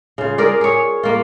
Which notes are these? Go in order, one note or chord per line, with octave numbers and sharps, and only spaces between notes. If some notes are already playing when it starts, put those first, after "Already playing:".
C#3 F4
G#4 A#4 D5
G#4 C#5
A#3 F4